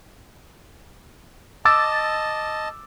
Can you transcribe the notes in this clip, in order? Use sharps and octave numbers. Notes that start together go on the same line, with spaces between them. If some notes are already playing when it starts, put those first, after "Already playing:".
D#5 A5 D6 E6 A6